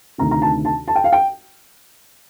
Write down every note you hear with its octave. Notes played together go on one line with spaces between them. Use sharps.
D2 C3 D#3 A#5
A#5
A5
A5
A5
G5
F5
G5